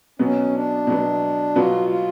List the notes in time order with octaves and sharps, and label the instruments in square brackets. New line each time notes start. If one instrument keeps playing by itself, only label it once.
[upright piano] B2 F#3 B3 [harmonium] C#4
[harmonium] D4
[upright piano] B2 F#3 B3
[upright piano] B2 F#3 B3 [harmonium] F4
[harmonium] F4